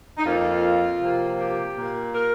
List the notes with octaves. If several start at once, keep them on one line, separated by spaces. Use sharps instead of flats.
D#4
F2 F3 A#3 F4
C3 F3 A#3
G4
A#2 A#3
A#4